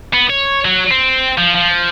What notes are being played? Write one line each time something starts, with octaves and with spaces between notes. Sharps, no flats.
B3
C#5
F#3
C4
F3
F3